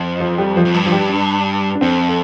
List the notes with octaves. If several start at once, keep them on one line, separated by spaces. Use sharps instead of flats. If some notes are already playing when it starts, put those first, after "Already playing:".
Already playing: F2
F3
G3
F3
F2
G2
F3
G3
D4
D4
F2 C4
A4